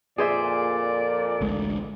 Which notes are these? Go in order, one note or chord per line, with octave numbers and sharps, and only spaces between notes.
F2 A#2 G#4 C5 D5 E5
A1 D2 G#3